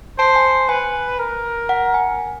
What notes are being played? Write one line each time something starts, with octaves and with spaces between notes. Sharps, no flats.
C5 A5
G#5
B4 G#5
A#4
F#5
G#5